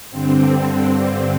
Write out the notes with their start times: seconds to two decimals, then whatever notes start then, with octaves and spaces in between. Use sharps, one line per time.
0.10 G2 D3 C4